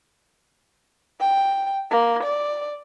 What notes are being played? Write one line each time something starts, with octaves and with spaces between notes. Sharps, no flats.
G5
A#3
D5